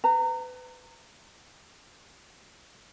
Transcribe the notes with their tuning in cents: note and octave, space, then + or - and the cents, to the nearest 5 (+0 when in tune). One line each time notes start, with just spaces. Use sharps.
B4 +30 A#5 -25